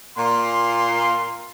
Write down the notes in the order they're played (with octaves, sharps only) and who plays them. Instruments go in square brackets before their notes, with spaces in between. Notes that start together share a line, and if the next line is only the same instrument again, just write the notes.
[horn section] A#2 F5 C6